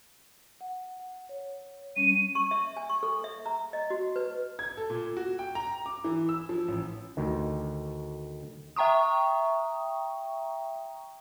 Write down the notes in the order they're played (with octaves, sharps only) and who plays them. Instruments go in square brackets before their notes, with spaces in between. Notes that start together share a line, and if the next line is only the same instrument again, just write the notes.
[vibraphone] F#5
F#5
C#5
[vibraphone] G3 C#4 [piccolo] D#7
[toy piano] C#6
E5
G#5
C#6
A4
E5
A#5
D#5
F#4
B4
[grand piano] G#6
A4
A#2
F#4
G5
A#5
D6
E3
E6
F3
A1
[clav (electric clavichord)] D2 D#3
[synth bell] E5 G5 A#5 C#6 D#6